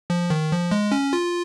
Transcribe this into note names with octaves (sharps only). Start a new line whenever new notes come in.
F3
D#3
F3
G#3
C#4
F4